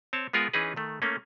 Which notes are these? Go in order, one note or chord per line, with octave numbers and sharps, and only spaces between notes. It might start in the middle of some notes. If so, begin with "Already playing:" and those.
C4 C#5 A5
G#3 B3 F4 A#4 F#5 G#5
E3 C#4 D#4 G#4 B4
D#3 A3
A3 A#3 C#4